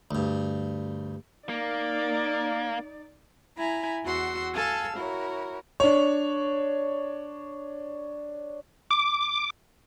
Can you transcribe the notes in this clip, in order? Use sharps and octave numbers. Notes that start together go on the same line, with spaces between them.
D2 G2
A#3 D#4 D5
E4 G#5 A#5 B5
E2 F#4 F#5 C6 E6
A4 F5 G#5 A5 E6
E4 F#4 A#4 C#5
D4 C#5
D6